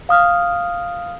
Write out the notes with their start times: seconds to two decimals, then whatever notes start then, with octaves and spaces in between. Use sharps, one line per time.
0.09 F5 D#6 F6